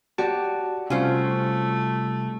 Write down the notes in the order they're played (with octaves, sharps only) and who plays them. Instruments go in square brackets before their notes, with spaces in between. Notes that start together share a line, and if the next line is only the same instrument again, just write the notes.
[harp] F#4 G4 D5 [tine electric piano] A5
[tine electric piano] C3 G3 [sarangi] A3 [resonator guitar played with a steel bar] C#4 F4 C5